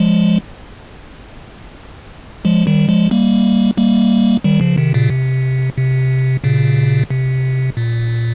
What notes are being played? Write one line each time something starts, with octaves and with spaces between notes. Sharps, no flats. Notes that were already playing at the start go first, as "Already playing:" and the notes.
Already playing: F3 G#3
F3 G#3
D#3 G3
F3 G#3
G3 A#3
G3 A#3
D#3 G3
C#3 F3
C3 D#3
A#2 C#3
C3
C3
A#2 C#3
C3
A#2